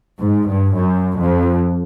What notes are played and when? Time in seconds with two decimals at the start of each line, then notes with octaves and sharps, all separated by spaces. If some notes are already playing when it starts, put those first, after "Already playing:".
0.21 G#2
0.50 G2
0.76 F#2
1.19 F2